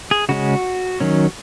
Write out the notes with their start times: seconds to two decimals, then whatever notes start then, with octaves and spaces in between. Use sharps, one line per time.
0.11 G#4
0.29 C#3 G#3 C#4 F#4
1.00 D#3 F#3 C#4